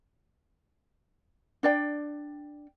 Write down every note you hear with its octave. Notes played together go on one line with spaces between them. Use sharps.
D4 D5 G5